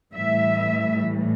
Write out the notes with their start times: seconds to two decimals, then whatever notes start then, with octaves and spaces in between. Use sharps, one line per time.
0.15 A2 E3 G3 E5